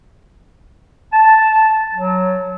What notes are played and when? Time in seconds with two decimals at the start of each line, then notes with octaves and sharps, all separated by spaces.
1.13 A5
1.95 F#3